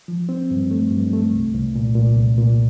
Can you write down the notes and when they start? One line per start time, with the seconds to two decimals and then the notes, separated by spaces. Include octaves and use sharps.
0.08 F3
0.29 C4
0.51 G2
0.71 A3
0.91 G2
1.13 A3
1.33 C2
1.55 C2
1.75 A#2
1.95 A#2
2.17 C2
2.38 A#2